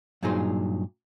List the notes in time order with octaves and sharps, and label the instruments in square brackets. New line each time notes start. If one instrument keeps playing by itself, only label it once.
[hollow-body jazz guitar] G2 A#2 F#3 D#4 G#4 C5